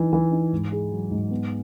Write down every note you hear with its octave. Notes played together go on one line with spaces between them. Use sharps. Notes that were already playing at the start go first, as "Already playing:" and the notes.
Already playing: E3 D#4
E3
D#4
G#2
G#4
F#3
G#2
B3